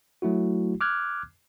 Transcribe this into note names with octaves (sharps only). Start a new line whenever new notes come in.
F#3 A3 E4 F#4
D6 F6 F#6 G#6